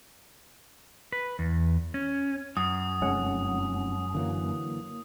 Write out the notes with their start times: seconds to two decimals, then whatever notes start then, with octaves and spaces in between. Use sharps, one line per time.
1.12 B4
1.39 E2
1.94 C#4
2.57 F#2 D#6
3.01 F1 G#3 C#4 F#5
4.14 D3 E3 F#3 A#3